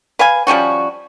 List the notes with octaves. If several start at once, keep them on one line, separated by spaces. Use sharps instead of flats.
B4 F5 G#5
F3 G3 C#4 F#4